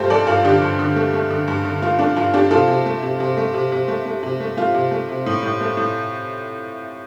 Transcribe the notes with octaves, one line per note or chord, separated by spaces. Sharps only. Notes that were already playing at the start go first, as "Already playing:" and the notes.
Already playing: G2 A3 F4 G4 A4 C5
G2 A4 D5
G2 F4 A4
D3 D4 G4
G2
D3
A3
A3
D3
G2
D3
A3 F4
A3 D4
G2 F4
A3 D4 G4
C3 F4 A4
C3
A3
C3
C3
A3
C3
C3
A3
A3
C3
A3
A3 F4
C3
A3
C3
A2
A2
A3
A2